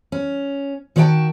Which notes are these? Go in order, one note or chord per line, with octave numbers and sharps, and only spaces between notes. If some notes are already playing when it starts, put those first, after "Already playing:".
C#4
D#3 F#4 C#5 D5 G5 A5